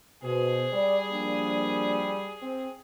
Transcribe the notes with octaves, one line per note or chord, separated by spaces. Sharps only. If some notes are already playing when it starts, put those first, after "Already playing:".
B2 G#4 C5
G3 D5
F3 A#3 D4
C4